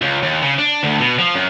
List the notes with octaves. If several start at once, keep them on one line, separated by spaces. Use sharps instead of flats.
C#2
D#2
C#3
D4
D2
B2
F3
F#2